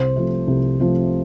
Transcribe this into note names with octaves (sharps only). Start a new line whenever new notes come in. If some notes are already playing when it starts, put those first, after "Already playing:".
Already playing: C2 C5
C3 F3 A3
C2
C3 F3 A3